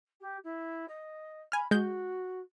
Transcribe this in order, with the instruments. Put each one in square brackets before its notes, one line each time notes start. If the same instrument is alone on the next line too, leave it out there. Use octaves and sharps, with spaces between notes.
[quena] G4
E4
D#5
[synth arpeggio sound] G#5 F6 [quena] B5
[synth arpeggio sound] G#3 G6 [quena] F#4